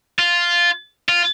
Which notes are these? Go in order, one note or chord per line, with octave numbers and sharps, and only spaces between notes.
F4
F4